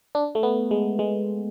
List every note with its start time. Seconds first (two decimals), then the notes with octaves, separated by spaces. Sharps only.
0.15 D4
0.35 A3
0.43 B3
0.71 G#3
0.99 G#3